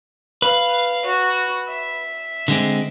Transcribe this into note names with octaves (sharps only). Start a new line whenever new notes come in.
B4 F5
F#4
E5
D3 G#3 C4